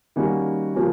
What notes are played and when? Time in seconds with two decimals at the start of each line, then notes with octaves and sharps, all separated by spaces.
0.16 D#3 G3 A#3 C#4 F#4
0.75 C#3 F3 A#3